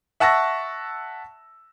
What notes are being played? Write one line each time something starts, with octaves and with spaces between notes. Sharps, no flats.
E5 F#5 A5 C#6 E6 A#6